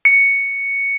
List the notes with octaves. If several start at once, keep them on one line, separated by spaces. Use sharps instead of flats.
C#7